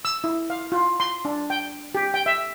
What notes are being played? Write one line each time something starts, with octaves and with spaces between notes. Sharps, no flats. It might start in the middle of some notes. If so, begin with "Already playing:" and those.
E6
E4
F5
F4
C6
D4
G5
G4
G5
E5